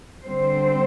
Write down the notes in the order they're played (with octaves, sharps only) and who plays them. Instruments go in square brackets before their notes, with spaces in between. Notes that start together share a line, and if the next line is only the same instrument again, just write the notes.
[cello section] D3 G3 C4 C5